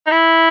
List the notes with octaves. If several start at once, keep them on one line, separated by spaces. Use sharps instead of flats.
D#4
E4